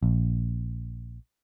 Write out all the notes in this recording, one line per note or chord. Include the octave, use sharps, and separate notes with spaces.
A#1